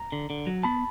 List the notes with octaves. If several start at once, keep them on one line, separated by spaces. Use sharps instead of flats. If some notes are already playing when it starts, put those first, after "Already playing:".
Already playing: A#5
D3
D3
F#3
B3 A5 B5